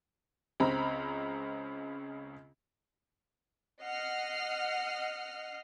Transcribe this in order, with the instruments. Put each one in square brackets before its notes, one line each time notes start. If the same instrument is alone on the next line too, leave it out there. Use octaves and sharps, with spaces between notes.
[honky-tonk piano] C#2 C#3 C4 A#5 B5
[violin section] D#5 F#5 F6 C7